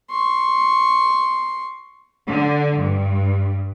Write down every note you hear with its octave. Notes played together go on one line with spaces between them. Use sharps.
C6 C#6
D3
G2